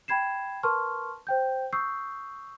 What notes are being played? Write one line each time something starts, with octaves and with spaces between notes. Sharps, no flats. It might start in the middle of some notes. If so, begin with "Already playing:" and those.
G5 B5 G#6 C7 E7
A#4 B4 A5 C6 C#6 F6
C5 G5 G6
C#6 D#6 E6 G6 C7